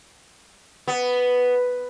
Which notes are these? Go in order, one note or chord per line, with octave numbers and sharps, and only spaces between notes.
B3